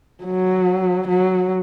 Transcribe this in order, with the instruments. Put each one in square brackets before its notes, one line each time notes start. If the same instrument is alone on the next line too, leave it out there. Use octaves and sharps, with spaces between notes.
[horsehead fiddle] F#3
F#3